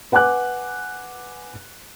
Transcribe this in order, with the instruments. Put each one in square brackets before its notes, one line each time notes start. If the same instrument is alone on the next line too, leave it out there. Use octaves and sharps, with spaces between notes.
[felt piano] B4 F#5 G#5 D6 F#6